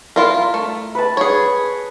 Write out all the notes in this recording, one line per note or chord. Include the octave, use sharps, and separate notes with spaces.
E4 F4 A#4
A3
B4 A5
G#4 C#5